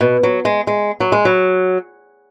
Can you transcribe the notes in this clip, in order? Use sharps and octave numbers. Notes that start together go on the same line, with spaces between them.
B2
F#3
G#3
G#3
F#3
G#3
F#3